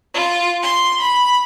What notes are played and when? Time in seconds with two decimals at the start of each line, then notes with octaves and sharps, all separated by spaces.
0.14 F4
0.63 C6
1.01 B5